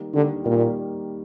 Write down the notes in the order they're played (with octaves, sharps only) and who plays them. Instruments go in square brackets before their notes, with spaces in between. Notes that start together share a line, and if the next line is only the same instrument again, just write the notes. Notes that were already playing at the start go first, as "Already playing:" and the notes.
Already playing: [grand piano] D#3 G3 A#3
[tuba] D3 [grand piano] D#3 G3 A#3
[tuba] A#2 [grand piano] D#3 G3 A#3